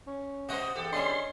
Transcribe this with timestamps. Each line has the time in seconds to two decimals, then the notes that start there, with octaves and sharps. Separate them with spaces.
0.07 C#4
0.49 B2 F#4 C5 D#5
0.75 E2 G4 A4
0.93 C#4 D4 D#5 C6